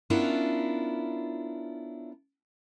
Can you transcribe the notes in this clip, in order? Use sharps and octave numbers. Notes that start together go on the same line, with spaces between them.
B3 C#4 D4 E4 F4 A#4